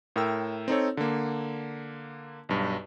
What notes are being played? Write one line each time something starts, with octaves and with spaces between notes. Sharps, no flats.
A2 A#4 G5 E6
C4 D#4 A4 C#5
D3 A#3
B1 G2